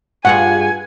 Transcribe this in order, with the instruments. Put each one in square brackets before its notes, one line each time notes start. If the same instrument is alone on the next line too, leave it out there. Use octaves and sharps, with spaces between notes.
[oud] G2 F4 G#4 [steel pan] F#5 [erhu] G#5